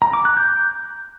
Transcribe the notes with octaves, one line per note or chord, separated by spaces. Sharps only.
A#5
D6
F#6
G6